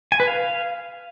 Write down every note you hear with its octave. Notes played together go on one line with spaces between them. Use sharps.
G#5
B4
F5